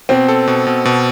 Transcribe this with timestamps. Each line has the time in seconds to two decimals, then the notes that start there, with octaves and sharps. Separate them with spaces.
0.09 B2 C4
0.28 A4
0.48 B2
0.67 B2
0.85 B2